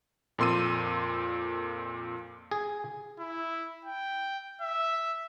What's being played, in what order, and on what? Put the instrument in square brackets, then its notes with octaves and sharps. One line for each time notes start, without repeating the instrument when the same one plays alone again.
[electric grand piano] F2 A#2 C6 E6 D#7
[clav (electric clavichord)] G#4
[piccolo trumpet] E4
G5
E5